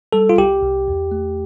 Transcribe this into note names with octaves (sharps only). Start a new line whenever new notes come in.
G3 A4
F4
C2 G4
C2
E2
A3